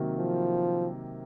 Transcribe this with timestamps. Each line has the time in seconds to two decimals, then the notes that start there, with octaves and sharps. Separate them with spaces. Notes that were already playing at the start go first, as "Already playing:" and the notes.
Already playing: C3 D#3 F#3 A#3
0.18 F3